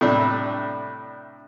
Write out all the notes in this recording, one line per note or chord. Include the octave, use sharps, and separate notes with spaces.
A2 C3 G3 D4